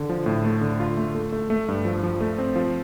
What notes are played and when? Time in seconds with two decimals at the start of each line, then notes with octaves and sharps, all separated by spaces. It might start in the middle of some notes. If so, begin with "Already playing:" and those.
Already playing: D3
0.09 F3
0.26 A2
0.44 A3
0.61 D3
0.80 F4
0.97 A3
1.15 A3
1.32 A3
1.50 A3
1.68 G2
1.85 F3
2.03 F3
2.21 A3
2.38 C4
2.56 F3